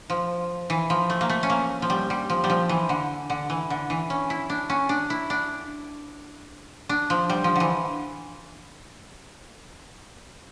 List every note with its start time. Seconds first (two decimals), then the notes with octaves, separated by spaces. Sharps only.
0.10 F3
0.70 E3
0.90 F3
1.10 A3
1.21 A#3
1.29 A3
1.43 C#4
1.50 A#3
1.82 F3
1.90 G3
2.10 G3
2.30 F3
2.44 G3
2.50 F3
2.69 E3
2.89 D3
3.30 D3
3.50 E3
3.70 D3
3.90 E3
4.10 C#4
4.30 E4
4.50 D4
4.70 C#4
4.89 D4
5.10 E4
5.30 D4
6.89 D4
7.10 F3
7.30 G3
7.44 F3
7.56 D3 E3